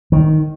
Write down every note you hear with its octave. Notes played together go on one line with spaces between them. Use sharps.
D#3